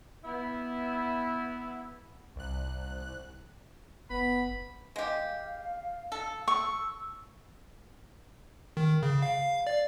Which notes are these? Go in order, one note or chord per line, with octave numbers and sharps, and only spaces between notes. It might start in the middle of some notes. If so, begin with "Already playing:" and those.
B3 E4
C2 F#6
F#1 B3 B5
G#3 G4 F5
A4
C#6 E6
D#3
C#3
F5
D5